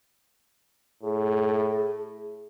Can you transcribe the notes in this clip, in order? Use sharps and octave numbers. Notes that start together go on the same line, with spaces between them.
A2 G#4